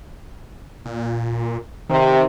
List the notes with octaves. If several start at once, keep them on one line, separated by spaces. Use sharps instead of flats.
A#2
C3 D#3